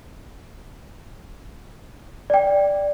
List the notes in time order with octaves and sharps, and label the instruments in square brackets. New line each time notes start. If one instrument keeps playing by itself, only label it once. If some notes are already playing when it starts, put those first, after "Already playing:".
[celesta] D5 G5